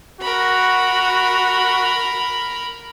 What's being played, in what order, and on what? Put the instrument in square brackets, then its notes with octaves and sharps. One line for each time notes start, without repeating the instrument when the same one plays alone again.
[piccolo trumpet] F#4 [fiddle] A#4 B5